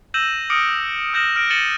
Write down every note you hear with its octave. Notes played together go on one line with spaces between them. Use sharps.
E6 G6 A#6 D#7 E7 F#7
D6 D#6 F6 A#6 C#7 D7
D#6 F6 G6 A#6 E7 F#7
F6 A#6 D7
A6 C#7 D#7 E7 F#7 G7